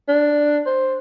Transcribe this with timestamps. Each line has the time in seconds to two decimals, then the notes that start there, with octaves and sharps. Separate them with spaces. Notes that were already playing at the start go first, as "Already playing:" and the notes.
0.08 D4
0.66 C5